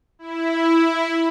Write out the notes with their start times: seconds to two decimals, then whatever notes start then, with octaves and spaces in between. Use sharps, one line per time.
0.19 E4